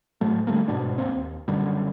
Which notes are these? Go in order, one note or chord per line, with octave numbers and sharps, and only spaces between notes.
A2 F#3 A3
D3 G3 A3 A#3
G1 G#2 B2 D4
D#1 A#3 C4
D#2
F#1 F#2 D3 G3